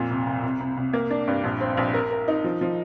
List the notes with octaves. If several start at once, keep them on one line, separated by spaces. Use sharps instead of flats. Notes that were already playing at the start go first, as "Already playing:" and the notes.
Already playing: F2 A#2
C2
C2
C2
C2
C2
A#3
D4
G2
A#1
C4
A#1
A#4
A#4
D#4
F3
F3